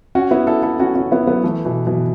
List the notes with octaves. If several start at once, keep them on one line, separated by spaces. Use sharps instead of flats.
C#4 F#4
B3 E4
E4 A4
E4 A4
C#4 F#4
C#4 F#4
B3 E4
F#3 B3
E3 A3
B2 E3
B2 E3